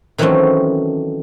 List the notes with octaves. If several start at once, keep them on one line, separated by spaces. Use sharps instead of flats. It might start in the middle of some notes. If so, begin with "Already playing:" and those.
D#3 E3 F#3 A3 C4 C#4